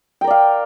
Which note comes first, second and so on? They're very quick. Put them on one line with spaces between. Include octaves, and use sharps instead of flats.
G5 A#4 D5 F5